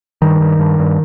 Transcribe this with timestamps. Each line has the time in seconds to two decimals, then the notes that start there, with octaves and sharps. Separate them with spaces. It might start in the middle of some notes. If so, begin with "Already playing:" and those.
0.22 G2 D#3
0.40 G2
0.59 G2
0.79 G2